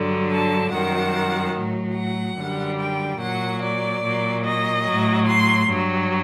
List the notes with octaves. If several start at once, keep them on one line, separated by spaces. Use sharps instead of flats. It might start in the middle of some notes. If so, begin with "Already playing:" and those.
Already playing: G2 D3 F#3
A5
F#2 D#3 G3 F#5
A2 F#3
F#5
F#2 D3 G3
G5
A#2 F#3 F#5
D5
A#2 F#3
D#5
A2 F#3
C6
G2 F#3